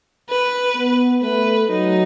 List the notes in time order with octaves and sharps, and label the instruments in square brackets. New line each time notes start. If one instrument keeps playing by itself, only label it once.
[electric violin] B4
[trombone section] B3
[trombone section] A3 [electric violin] B4
[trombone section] F#3 [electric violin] D#4